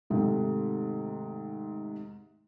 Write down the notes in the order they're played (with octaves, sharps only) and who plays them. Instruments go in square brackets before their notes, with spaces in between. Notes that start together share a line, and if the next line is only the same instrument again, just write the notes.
[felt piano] G#2 C3 D#3 A3